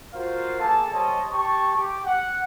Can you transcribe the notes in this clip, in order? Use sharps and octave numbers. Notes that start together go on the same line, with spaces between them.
F4 F#4 A#4 C5 F5
A#3 G#4 A4 A5
G3 C5 C#5 D#5 A5
G4 A5 C#6
G4
F#5